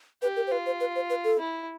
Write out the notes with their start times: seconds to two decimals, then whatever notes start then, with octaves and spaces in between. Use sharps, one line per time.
0.22 G4 B4
0.36 A#4
0.47 C5
0.51 F4 B4
0.66 C5
0.80 B4
0.95 C5
1.10 B4
1.24 A4
1.39 E4